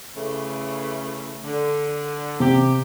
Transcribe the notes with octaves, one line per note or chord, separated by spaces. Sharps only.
C#3 E3 A3
D3
C3 G4